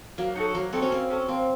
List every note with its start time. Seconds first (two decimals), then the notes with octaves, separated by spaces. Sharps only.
0.18 F#3 A#3
0.35 D#4 F#4 A4
0.55 F#3 A#3
0.73 C4 D#4 F#4 A4
0.82 C#4
0.91 A#3 C4
1.10 C#4 A4
1.28 A#3 C4